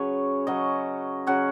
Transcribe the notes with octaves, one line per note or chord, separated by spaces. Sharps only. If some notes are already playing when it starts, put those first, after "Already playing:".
Already playing: C#3 F#3 C#4 G#4 B4 C#5
C#3 F#3 C#4 D#5
C#3 F#3 C#4 F#5